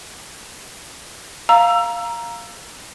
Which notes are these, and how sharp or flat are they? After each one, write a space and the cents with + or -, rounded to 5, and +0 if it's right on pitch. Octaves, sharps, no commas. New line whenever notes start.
F5 +0 A#5 +10 E6 +20